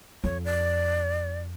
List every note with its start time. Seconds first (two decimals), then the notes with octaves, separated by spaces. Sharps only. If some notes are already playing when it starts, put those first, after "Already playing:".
0.24 F2 C#5
0.45 D5